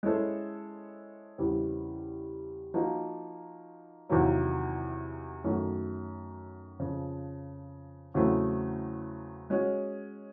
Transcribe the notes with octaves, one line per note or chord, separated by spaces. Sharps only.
G#3 C#4 E4 A4 C5
E2 C#3 E3 G3 C4
F3 A#3 D#4 F#4
E2 C3 D#3 F#3 A#3
F#2 D#3 F#3 A3
F2 C#3 F3
E2 C#3 F#3 A3 C4
G#3 C#4 F#4